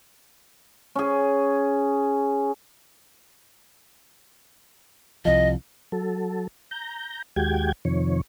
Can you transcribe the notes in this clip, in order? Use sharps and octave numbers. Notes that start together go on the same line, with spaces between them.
C#4 G#4
C2 F3 D#5
F#3 A4
A#5 G6
D#2 G#3 F#4 G4 G5 G#6
F2 C3 D#3 F3 C#5